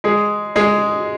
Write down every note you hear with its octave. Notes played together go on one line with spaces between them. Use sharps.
G#3 G#4
G#3 G#4